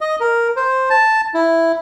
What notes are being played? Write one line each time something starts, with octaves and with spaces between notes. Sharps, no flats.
D#5
A#4
C5
A5
E4